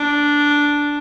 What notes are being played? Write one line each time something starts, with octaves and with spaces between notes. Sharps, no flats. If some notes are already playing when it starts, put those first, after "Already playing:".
Already playing: D4